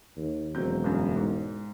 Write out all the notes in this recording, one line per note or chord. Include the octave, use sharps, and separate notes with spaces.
D#2
E1 F#3 C4 G6
G1 F#2
G#2